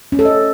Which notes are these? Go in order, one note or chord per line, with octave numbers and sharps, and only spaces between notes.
C#4
A4
D#5